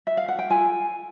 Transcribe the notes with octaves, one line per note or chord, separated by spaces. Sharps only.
E5
F5
F#5
G5
F4 A4 G#5